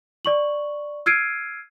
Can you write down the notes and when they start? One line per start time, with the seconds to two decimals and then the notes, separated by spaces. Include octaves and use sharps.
0.25 D5 C#6 F#7
1.06 E6 F6 G#6 C7 D7 D#7